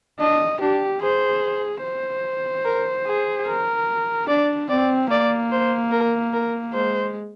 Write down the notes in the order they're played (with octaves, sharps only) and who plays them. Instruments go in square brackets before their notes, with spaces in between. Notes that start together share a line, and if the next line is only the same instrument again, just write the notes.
[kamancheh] D4 [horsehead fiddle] D#5
[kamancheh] D4 [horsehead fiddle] G4
[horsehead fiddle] G#4 [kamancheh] C5
[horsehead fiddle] C5
[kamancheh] A#4
G#4
[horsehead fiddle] A#4
[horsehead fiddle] D4 [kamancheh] D5
[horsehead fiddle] C4 [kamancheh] D5
[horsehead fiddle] A#3 [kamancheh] D5
[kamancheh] C5
A#4
A#4
[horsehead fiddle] G#3 [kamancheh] C5